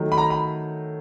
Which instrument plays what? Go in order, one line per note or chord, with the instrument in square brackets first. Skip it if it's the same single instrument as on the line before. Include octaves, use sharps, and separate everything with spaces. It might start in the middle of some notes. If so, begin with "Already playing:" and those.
Already playing: [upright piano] D#3 F#3 A3
[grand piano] B5
A#5
B5